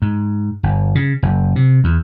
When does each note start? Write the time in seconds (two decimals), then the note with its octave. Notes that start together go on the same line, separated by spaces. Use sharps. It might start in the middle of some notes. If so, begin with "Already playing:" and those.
0.02 G#2
0.63 G1
0.95 C#3
1.23 F#1
1.56 C3
1.84 E2